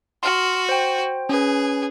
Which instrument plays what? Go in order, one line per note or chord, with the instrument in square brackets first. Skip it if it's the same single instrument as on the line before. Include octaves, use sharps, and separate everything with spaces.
[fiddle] F#4 [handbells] C6 F6
[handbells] C5 G5
[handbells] C#4 B4 [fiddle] G#4